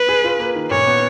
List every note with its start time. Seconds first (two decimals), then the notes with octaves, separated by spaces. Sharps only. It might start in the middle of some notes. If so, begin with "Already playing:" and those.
Already playing: B4
0.09 G#4
0.24 F4
0.40 A#3
0.55 D#3
0.71 A#2 C#5
0.87 B3